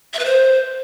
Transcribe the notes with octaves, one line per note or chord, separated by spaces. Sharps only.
E5
B4
C5